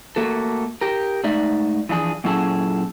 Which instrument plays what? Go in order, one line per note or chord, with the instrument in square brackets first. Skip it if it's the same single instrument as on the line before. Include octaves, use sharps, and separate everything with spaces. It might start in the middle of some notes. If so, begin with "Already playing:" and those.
[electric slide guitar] A3 A#3 F#4 A4
G4 A#4
G#2 A3 D#4 D5 E5
E3 F3 D4 G#4
A#2 F#3 C#4 E4 G#4 A4